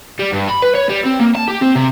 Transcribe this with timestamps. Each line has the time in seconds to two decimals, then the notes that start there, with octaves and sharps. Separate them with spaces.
0.19 G3
0.33 G2
0.49 B5
0.63 B4
0.75 C#5
0.90 G3
1.04 C4
1.20 A#3
1.35 A5
1.48 G4
1.61 C4
1.75 C3